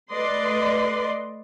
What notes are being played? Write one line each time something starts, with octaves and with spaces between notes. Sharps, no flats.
A3 B4 D5 D#5 C6